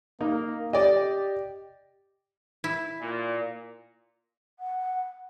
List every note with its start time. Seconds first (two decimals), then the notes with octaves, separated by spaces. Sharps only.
0.21 A#3 D#4
0.73 G4 D5 D#5
2.64 E4
3.01 A#2
4.59 F#5